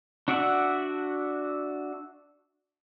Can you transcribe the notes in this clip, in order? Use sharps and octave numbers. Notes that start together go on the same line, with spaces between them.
D4 F#4 D5 E5 F#5